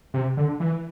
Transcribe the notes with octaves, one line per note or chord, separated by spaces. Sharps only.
C3
D3
E3